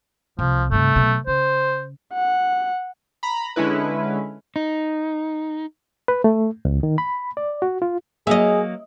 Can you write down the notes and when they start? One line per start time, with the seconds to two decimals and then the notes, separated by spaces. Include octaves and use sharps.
0.39 C2 F3
0.71 G2 C3 A3
0.96 B2 F#3
1.27 C#3 C5
2.14 F#5
3.23 A#5 B5
3.56 D3 G#3 C#4 E4 B4
4.56 D#4
6.08 B4
6.24 A3
6.65 C#2
6.83 D#3
6.98 B5
7.37 D5
7.62 F#4
7.82 F4
8.27 F#3 A#3 G#4 D#5 E5